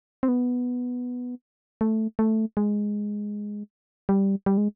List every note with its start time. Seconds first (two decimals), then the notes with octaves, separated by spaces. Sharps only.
0.23 C4
0.28 B3
1.81 A3
2.19 A3
2.57 G#3
4.09 G3
4.46 G3
4.57 G#3